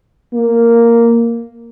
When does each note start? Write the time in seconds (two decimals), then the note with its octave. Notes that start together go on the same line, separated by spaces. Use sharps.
0.34 A#3